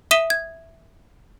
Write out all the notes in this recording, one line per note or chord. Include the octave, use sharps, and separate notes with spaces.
E5 D#6 B6 D#7 E7 G7
G#6